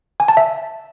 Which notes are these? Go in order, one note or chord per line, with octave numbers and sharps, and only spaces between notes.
G#5
A5
E5